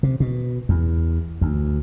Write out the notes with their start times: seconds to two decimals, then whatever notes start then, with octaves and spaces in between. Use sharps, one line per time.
0.03 C3
0.20 B2
0.69 E2
1.41 D2